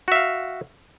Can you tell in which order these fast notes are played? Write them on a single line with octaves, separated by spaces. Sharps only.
F#4 E5 F5